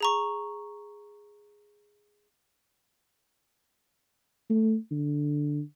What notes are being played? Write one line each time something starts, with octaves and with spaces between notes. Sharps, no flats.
G#4 A#5 C#6
A3
D3